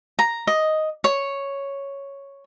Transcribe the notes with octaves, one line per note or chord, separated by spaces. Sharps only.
A#5
D#5
C#5